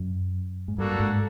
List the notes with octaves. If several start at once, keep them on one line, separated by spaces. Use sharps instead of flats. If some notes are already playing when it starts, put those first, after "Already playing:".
Already playing: F#2
G#2
G2 A#3 D4 F#4 A4
G#2